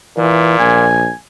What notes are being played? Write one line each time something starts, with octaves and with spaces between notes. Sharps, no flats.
A#2 E3
A#1 G#5